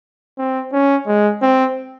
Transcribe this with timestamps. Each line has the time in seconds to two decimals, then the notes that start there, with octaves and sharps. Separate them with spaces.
0.39 C4
0.73 C#4
1.07 G#3
1.42 C4